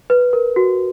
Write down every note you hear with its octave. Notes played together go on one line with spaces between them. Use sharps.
B4
A#4
F#4